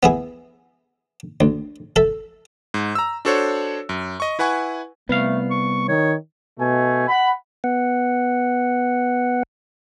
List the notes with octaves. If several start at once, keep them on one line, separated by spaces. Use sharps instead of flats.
B3 E4 G#4
D2
A4 E5
G#2
A#5 E6
D4 F#4 A4 C5 C#5
F#2
D#5 C#6
E4 B4 F#5 G#5 C#6
C2 A3 B3 F5
C#6
D#3 C#5
B2 A3 G#5
F#5 B5
B3 F#5